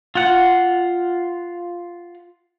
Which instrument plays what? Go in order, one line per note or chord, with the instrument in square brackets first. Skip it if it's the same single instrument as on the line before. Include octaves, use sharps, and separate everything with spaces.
[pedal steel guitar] F4 F#5